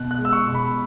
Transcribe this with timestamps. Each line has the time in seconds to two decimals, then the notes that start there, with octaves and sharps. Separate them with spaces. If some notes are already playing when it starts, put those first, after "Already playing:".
Already playing: B2 F#6
0.11 F#6
0.18 G#3
0.25 E6
0.33 C#6
0.47 B2
0.54 B5